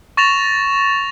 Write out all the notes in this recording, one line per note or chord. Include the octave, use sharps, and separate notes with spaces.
C#6 A6 A#6 E7 F7